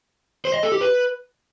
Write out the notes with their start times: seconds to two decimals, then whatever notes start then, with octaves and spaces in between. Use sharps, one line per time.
0.45 C5
0.54 D#5
0.63 A4
0.72 G4
0.81 B4